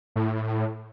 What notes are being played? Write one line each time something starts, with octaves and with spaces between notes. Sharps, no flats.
A2